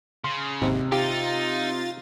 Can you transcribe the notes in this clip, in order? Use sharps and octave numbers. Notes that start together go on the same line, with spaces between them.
C#3 C6
G#1 D#2 C3
D#4 F4 G4 A6